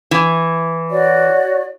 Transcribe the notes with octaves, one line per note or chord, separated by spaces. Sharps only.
E3
F#4 C#5 D5